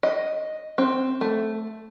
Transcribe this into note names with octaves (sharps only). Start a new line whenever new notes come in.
D#5
C4
A3